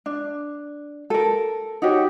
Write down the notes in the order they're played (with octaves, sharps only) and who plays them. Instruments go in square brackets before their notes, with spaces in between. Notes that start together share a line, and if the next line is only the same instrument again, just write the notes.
[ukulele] D4
A4 A#4
D#4 F#4 G4 C#5